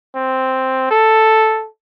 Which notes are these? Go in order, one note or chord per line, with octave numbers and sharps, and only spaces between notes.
C4
A4